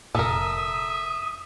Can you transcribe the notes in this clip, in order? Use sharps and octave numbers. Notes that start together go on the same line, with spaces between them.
F1 A#2 A4 A#4 E5 D#6